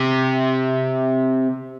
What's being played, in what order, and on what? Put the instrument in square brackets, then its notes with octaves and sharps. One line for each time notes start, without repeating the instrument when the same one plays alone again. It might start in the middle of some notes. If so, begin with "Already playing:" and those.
Already playing: [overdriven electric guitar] C3